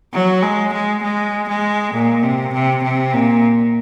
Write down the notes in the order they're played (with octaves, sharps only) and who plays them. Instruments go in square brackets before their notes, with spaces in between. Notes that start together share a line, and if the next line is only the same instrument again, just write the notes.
[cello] F#3
G#3
G#3
G#3
G#3
A#2
C3
C3
C3
A#2